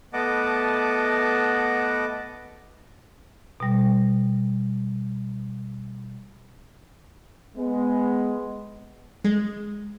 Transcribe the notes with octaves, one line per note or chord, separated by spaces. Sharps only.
A3 B3 D#5 F#5 A5 D6
B2 G3
G#3 B3
G#3